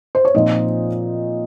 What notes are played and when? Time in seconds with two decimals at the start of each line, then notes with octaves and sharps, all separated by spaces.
0.15 C5
0.25 C#5
0.35 A#2 F3 C4 D#4 D#5